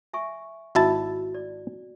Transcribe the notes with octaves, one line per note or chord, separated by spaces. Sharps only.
E5 G#5 C#6
G#1 E4 F#4 A5
D5